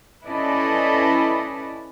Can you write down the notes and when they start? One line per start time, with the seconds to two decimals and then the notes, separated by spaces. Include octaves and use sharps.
0.24 C#4 E4 A4 B4 D5 D#5